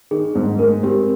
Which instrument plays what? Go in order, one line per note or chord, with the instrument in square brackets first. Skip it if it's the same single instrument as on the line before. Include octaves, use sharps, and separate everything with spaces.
[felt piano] D#3 [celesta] G#4
[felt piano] G#2
[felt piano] G#3 [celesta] A#4
[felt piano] C4 [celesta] G4